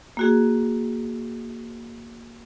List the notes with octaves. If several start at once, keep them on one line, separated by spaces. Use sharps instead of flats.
A#3 F#4 G#4